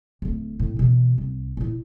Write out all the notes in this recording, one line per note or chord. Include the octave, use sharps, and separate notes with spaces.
D1 A3
A2
B2 E3
C2
A#2 E4